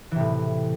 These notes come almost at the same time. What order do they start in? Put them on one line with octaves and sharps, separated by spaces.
E3 C3 A2